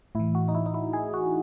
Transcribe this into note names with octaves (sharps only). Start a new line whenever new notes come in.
A2 E3 E4
F#4
D#4
E4
D#4
E4
G#4
F#4